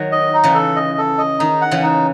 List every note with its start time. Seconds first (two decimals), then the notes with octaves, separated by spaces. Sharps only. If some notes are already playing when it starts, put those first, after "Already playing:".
Already playing: D#3 F#3
0.12 D#5
0.34 D#4
0.44 C#3 E3
0.54 A4
0.76 D#5
0.98 A4
1.18 D#5
1.39 D#3 D#4
1.61 F#5
1.71 C#3 E3
1.83 D#4